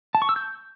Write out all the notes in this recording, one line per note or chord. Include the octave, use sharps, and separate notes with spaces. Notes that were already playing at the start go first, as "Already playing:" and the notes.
A5
C#6
E6
G6